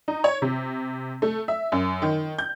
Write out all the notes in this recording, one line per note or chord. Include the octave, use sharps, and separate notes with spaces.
D#4
C#5
C3
A3
E5
F#2
D#3
G6